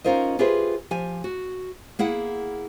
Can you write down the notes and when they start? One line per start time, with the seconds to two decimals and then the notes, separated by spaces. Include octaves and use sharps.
0.04 C#4 D#4 F4 A#4 C5 D#5
0.39 F4 G4 G#4 B4 C5 E5
0.91 F3 G4 G#5
1.24 F#4
1.99 A#3 E4 G#4 F#5